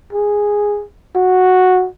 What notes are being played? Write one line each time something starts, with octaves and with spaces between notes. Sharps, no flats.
G#4
F#4